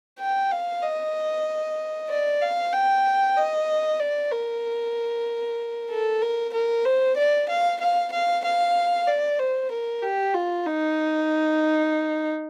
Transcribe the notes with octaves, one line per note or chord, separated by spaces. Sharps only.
G5
F5
D#5
D5
F5
G5
D#5
D5
A#4
A4
A#4
A#4
C5
D5
F5
F5
F5
F5
D5
C5
A#4
G4
F4
D#4